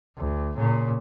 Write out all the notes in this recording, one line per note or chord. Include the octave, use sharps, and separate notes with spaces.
D2
A#2 C#3